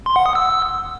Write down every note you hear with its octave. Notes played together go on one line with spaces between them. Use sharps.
C6
F#5
D#6
E6